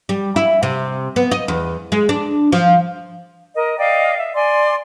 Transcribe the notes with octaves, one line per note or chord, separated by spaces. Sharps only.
G3
E4
C3
B3
D#5
E2
G#3
D4
F3
A#4 D#5
D5 D#5 F5 G5
E5
D5 G#5 C6